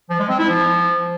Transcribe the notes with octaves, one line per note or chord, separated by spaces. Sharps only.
F3
G#3
C4
E4
F3